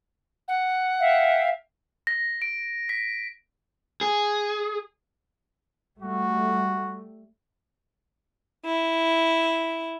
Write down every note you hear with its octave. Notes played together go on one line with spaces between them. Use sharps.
F#5
E5 F5 G5
A#6
D7
B6
G#4
G3 A3 F#4
E4